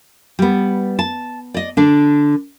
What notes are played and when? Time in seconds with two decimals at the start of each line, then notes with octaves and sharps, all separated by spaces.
0.39 G3 B3
0.99 A5
1.54 D5 D#5
1.77 D3 D4